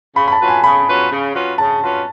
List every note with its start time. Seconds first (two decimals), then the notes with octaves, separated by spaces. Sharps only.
0.16 C#3 B5
0.28 B5
0.32 A5
0.40 F#3 C#4 F4 B4
0.48 G#5
0.64 C#3 B5
0.88 F#3 C#4 F4 B4
1.11 C#3
1.34 F#3 C#4 F4 B4
1.58 C#3 A5
1.82 F#3 C#4 F4 B4